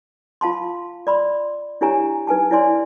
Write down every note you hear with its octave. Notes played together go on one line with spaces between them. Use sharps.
F4 F5 A5 C6
D5 B5 C6
D4 E4 G4 C#5 G#5 A#5
D#4 B4 G#5 A5
E4 C#5 D5 G#5 C6